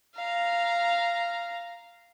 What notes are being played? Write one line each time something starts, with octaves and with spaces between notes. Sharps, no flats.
F5 A#5